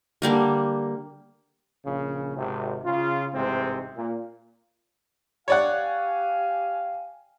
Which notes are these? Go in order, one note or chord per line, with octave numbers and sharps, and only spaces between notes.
D3 G3 A#3 A#4
A#1 C#3
G#1 C3
C#3 F4
A1 G#2 C3 C4
A#2
G4 C#5 D5 F5 F#5 G#5